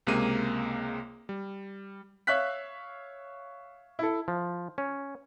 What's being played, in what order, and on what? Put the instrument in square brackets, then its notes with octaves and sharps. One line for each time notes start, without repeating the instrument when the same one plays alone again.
[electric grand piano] C#2 C3 G#3 A#3 D#7
G3
[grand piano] C#5 E5 F5 F#6 B6
E4 A4
[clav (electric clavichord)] F3
C#4